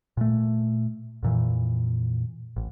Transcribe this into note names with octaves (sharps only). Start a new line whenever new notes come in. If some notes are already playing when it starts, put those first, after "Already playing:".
A#2 A3
F2 A#2 E3
A1